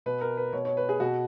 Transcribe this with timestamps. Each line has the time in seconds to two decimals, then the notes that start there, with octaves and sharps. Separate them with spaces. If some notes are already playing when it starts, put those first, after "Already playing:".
0.06 B2 B4
0.21 A#4
0.37 B4
0.53 B2 C#5
0.65 C#5
0.77 B4
0.89 G#4
1.00 B2 F#4